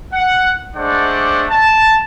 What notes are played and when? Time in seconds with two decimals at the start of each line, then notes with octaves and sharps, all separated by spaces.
0.13 F#5
0.75 G#3 A3 D4 C5 D5 F#5
1.50 A5